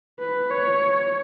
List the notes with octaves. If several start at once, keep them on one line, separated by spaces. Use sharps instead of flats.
B4
C#5